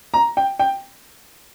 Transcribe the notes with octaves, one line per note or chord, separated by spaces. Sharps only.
A#5
G5
G5